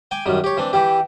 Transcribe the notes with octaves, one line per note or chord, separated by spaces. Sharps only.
G5 G#5 D6
F#2 D#3 G3
G4 C#5
E3 C4 D4
E3 E4 G4 G5